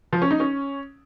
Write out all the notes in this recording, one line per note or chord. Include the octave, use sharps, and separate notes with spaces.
F3
C#4
D#4
C#4